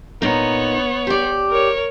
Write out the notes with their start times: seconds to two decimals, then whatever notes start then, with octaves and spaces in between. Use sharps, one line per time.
0.22 A#2 B3 D#4 C#5
1.07 G4 D5
1.50 A#4 C#5